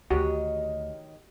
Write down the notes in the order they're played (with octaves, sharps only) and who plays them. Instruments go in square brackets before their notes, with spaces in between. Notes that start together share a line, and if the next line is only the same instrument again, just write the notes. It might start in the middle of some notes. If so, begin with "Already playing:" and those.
[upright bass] D2 [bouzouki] D#3 C#5 D#5 [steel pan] F#4 [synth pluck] G4